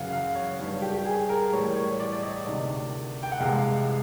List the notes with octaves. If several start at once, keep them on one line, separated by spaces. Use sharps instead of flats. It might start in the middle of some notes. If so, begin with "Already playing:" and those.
Already playing: F#2 C#3 E3 F5 F#5
F5
C#5
G2 D#3 G3 C#5
G4
G4
G#4
A#4
A2 E3 G3 C#5
C#5
D5
D5
D#5
D2 C3 D#3 D5
G5
F#5
C2 C3 E3 G#3 F5